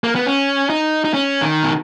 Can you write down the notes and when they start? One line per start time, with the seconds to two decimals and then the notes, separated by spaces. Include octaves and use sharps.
0.04 A#3
0.15 B3
0.27 C#4
0.70 D#4
1.05 D#4
1.14 C#4
1.42 D#3
1.63 B2